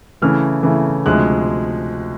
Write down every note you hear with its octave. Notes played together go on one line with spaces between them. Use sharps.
C#3 E3 A3 F6
C#3 E3 A3
D2 C3 F3 G#3 F#6